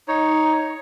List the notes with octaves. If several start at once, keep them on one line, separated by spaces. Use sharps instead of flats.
D#4 C#5